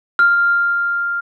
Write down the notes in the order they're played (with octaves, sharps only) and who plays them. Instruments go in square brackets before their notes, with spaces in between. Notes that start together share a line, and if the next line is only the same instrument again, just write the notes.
[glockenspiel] F6